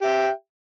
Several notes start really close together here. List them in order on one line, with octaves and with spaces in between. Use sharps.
G4 E5 G5